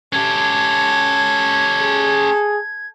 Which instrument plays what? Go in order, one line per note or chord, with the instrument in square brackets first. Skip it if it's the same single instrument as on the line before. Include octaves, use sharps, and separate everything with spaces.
[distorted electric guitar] C#4 G4 [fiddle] A4 [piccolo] G#6
[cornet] G#4